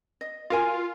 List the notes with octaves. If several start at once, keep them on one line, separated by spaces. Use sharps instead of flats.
D#5
F4 F#4 A#4 G#5